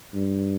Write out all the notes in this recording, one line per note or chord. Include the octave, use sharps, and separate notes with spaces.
G2